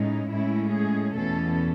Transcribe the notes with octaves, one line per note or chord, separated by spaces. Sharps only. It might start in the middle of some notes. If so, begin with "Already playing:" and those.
Already playing: A2 G#3 C#4 D#4
A2 G#3 C#4 E4
G#4
E2 B2 A3 C#4 A4